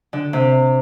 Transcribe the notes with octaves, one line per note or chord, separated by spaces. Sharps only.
D3
C3